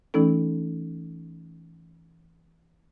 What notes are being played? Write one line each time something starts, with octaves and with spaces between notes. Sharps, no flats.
E3 A3 C#4 D#4 A4